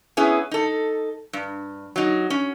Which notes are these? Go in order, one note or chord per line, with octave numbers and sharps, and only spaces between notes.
B3 C#4 E4 G#4
D#4 A4
G2
F#3 D#4
C#4